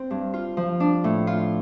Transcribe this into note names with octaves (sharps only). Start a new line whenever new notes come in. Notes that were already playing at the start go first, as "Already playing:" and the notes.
Already playing: C4
G2
F4
F3
D4
A2
F4